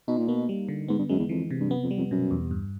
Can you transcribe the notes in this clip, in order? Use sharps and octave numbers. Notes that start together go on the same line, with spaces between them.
B2 D#4
A#2
B2 A#3
G3
D3
G#2 B3
G2
F#2 G#3
E2
F2 E3
C3
G2
F#2 B3
F2
G3
F2
F#2 B2
E2
G2